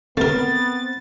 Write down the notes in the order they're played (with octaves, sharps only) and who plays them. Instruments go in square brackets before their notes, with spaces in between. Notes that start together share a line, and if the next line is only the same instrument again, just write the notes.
[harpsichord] A3 A#4 [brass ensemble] B3 [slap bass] C4 [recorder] A6